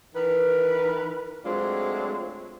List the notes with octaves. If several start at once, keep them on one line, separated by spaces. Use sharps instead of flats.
D#3 E3 A#4 B4
F#3 G#3 A3 C4 D4 F4